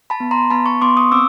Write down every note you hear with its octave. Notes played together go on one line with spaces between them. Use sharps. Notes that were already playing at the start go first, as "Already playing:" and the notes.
A5 B5
B3
A#5 C6
B3 A5 B5
B5 C#6
B3 C6 D6
C#6 D#6
C4 D6 E6